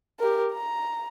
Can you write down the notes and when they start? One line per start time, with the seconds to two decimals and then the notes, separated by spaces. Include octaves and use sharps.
0.20 G4 A#4
0.54 A#5